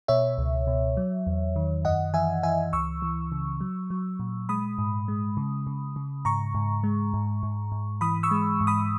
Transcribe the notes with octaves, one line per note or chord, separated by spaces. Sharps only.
B2 C#5 E5
C#2
B2
F#3
E2
D#3
F#2 D#5 F#5
E3 E5 G#5
E3 E5 G#5
C#2 C#6 E6
E3
C#3
F#3
F#3
A#2
G#3 B5 D#6
G#2
G#3
C#3
C#3
C#3
G#2 A#5 C#6
G#2
G#3
G#2
G#2
G#2
E3 B5 D#6
C#6 E6
G#3
G#2
B5 D#6